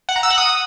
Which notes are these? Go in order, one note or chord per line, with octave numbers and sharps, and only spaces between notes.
F#5
A#5
E6
F#5
D#6